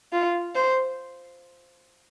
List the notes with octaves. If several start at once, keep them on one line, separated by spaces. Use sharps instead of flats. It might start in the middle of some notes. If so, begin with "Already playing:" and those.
F4
C5